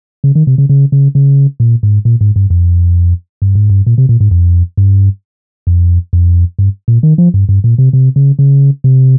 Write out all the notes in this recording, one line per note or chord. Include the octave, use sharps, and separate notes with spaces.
C#3
D#3
C3
C#3
C#3
C#3
C#3
A#2
G#2
A#2
G#2
G2
F2
G2
G#2
G2
A#2
C3
A#2
G#2
F2
G2
F2
F2
G2
A#2
D#3
F3
G2
G2
A#2
C3
C3
C#3
C#3
C3